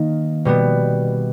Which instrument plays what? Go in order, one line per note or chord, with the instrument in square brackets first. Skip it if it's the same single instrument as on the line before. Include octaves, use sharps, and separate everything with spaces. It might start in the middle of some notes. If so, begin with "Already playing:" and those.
Already playing: [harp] D#3 A#3 D#4
B2 G3 B3